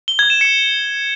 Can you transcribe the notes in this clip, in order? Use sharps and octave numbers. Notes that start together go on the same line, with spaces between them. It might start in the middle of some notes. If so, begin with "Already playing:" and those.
G7
G#6
E7
C#7